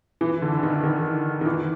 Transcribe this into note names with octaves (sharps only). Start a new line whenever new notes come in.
E3
D3
D#3
D#3
D#3
E3